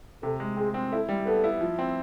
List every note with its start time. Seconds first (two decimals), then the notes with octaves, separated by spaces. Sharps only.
0.23 C3 A4
0.40 G#3
0.57 C4 G#4
0.74 C4
0.92 E4 A4
1.09 G3
1.27 B3 A4
1.44 E4
1.61 F3
1.79 C4